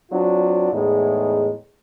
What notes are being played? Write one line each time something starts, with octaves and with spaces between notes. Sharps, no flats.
F#3 C4 D4 F4
E2 A2 G#3 D#4